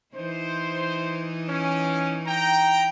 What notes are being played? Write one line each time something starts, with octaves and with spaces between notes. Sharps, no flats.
E3 D#4 E4 C5
C#4
G5 A#5